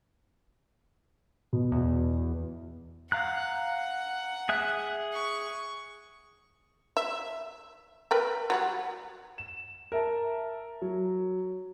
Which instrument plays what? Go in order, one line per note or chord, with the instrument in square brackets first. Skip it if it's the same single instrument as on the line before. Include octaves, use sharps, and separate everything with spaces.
[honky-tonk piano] B2
[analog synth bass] E2
[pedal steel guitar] F5 A#5 F#6 [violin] F#5
[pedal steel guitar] G#4 E5 F#6
[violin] C#6
[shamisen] E5
A#4 B4 G5
F#3 G3 F#5
[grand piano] E7
A#4 E5 A5
F#3